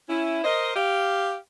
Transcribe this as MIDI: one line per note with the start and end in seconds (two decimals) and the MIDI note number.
0.09 0.41 61
0.09 0.41 64
0.44 0.75 70
0.44 0.75 72
0.44 0.75 75
0.76 1.35 67
0.76 1.35 77